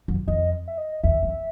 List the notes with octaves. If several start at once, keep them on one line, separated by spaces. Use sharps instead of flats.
F#2
F2 D#5
E5
D#5
E2 E5
F2